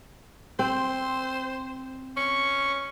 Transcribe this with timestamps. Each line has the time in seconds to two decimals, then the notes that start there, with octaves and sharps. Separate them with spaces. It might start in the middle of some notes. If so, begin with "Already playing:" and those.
0.59 C4 C5
2.17 C#4 C#6